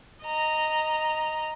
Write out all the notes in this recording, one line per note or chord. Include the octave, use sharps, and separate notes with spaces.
D#5 A#5